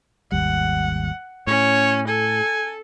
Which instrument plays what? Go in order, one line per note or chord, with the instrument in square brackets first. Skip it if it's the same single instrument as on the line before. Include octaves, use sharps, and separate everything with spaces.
[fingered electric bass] G#1 D#2 G3 [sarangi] F#5
[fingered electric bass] A2 [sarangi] C#4 [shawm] C#5
[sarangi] A4 [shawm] G#5